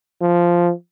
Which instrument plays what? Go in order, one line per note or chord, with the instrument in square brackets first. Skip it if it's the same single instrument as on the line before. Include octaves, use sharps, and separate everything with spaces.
[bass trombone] F3